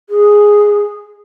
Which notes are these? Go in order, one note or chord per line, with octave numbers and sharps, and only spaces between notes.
G#4